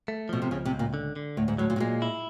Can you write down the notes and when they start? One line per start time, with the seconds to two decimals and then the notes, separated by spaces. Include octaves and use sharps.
0.08 A3
0.29 B2 F3
0.42 C3
0.51 C#2 C#3
0.65 C3
0.72 C#2
0.79 A#2
0.94 D3
1.16 D3
1.37 D2 A2
1.48 G#2
1.58 A2 F#3
1.70 A#2
1.76 A2
1.80 A#2 G#3
2.02 E4